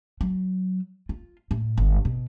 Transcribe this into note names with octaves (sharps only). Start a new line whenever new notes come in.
F#3
F4
A2
G1
B2